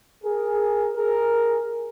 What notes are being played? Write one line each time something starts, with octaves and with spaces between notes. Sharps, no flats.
G#4 A#4
G#4 A#4